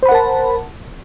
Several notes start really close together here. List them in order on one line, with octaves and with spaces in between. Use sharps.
C5 B5 F#5 A#4 A5